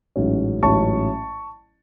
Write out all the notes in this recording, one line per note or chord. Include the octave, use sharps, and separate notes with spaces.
A1 G#2 F#3 C#4
A1 G#2 F#3 C#4 A5 C#6